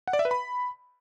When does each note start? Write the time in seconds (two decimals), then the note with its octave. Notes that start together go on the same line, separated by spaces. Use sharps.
0.08 F#5
0.13 D5
0.19 E5
0.25 B4
0.31 B5